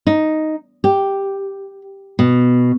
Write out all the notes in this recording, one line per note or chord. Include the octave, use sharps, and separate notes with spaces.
D#4
G4
B2